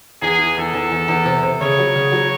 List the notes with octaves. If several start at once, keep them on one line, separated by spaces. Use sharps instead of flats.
E2 G#4
E3
E2 A4
E2
E2
E2
C3
C3
C#3 C#5
F#3
C#3
F#3